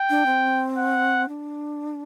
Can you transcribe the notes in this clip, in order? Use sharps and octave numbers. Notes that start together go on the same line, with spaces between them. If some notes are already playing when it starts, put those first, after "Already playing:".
Already playing: G5
D4
C4
F#5
D4